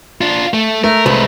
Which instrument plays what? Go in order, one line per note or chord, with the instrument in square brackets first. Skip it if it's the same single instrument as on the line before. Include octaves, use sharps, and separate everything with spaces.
[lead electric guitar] D4 F4
A3
[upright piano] A3 [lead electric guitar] A#4
[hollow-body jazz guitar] C2 [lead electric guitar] G#3 B4